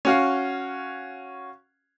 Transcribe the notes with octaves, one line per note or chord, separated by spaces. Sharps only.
C#4 F#4 F5